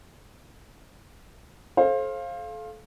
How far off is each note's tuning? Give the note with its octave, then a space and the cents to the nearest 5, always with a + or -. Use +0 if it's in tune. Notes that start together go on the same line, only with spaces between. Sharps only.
A4 -30 C5 +30 F5 -5